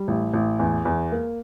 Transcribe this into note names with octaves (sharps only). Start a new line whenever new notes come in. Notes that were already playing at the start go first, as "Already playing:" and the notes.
Already playing: G3
A1
A1
E2
E2
A#3